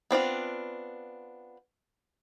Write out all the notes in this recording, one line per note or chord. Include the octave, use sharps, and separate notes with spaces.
B3 C4 D4 F4